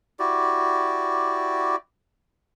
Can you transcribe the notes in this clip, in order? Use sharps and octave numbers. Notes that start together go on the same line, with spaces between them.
E4 F#4 G4 D5